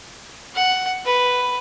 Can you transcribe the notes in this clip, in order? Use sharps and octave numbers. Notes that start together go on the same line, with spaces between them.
F#5
B4